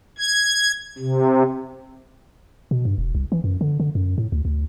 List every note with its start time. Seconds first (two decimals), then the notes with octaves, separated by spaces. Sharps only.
0.18 G#6
0.98 C3
2.71 B2
2.85 G2
2.98 E1
3.15 C2
3.32 E3
3.44 F#2
3.61 D3
3.80 D3
3.95 F#2
4.18 A2
4.32 D2
4.45 D2